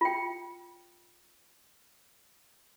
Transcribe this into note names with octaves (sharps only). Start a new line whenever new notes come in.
F4 G5